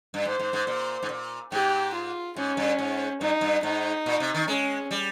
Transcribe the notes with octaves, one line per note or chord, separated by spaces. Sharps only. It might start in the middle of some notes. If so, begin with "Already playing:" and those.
G2
G#2 C5
G#2
G#2
A#2
G#2
A#2
G#2 G4
F4
G#2 C#4
G2
G#2
G2 D#4
G2
G#2 D#4
A#2
C3
D#3
G#3 C#4
G3